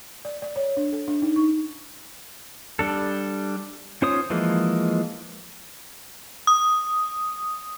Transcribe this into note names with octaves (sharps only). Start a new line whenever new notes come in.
D5
D5
C#5
D4
A4
D4
D#4
C#6
G3 D4 A4
C#4 F4 C5 C#5 D#6
E3 F3 G#3 A#3
D#6